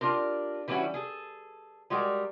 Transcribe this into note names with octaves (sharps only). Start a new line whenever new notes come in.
D4 F4 G4 A#4
E3 G3 B3 C#4 E4 F#4
G#4 A4
G3 G#3 F#4 G4 A#4